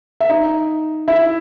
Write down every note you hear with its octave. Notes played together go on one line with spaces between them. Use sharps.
E5
D#4 D#5
E4 E5